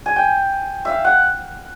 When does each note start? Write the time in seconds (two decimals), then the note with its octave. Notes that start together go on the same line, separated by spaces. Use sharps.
0.06 G#5
0.16 G5
0.85 E5 F5
1.05 F#5